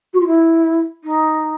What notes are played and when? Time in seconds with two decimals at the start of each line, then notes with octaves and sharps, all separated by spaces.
0.14 F#4
0.20 F4
0.27 E4
1.04 D#4